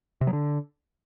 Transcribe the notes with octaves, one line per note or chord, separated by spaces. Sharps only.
C3
F#3
D3